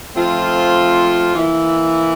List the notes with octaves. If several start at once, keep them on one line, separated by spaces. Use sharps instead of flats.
F3 A3 C4 F4
E3 A#3 E4